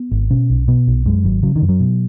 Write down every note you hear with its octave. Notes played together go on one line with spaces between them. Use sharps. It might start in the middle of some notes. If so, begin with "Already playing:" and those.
Already playing: B3
G#1
B2 C#4
B1
B2 B3
B1
F#2 G#3
G#1 F#3
C#3 F#3
D#3
F#2
F#3
B2